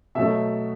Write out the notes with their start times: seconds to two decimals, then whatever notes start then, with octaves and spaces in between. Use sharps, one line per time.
0.15 B2 F#3 A3 E5